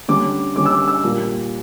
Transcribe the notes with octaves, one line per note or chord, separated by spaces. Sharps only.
D3 G3 C#4 D6
D3 G3 C#4 D6
E6
D6
E6
A#2 G3 A#3